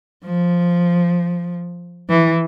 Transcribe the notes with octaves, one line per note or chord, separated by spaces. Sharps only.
F3
E3